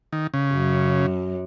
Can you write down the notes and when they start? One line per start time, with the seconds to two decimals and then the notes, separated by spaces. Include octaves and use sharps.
0.13 D#3
0.34 C#3
0.54 F#2